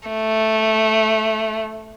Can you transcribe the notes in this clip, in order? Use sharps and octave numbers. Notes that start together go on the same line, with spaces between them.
A3